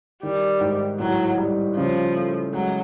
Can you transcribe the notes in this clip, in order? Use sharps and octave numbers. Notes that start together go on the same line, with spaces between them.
D#3 G3
G#2
A2 F#3
G3
C#3 F3
A3
F#3 G#3